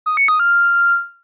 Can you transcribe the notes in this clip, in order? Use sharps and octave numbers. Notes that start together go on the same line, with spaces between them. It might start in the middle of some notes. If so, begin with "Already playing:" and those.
D#6
C#7
D#6
F6